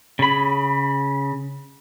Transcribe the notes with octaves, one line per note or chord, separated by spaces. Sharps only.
C#3 B5